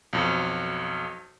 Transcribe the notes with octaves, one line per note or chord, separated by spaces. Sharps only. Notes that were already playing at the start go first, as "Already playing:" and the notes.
B1 F2